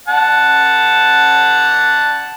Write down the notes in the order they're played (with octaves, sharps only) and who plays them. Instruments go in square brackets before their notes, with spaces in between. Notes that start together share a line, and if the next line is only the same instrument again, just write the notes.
[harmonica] F#5 A5